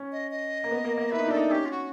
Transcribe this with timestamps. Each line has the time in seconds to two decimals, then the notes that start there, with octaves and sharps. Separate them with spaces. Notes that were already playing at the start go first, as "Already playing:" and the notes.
Already playing: C#4
0.12 D#5
0.31 D#5
0.64 A#3
0.71 B3
0.84 A#3
0.97 A#3
1.11 E4 B4
1.19 D#4
1.28 D4 A4
1.36 D#4
1.51 C#4 G4
1.66 F4
1.71 F#4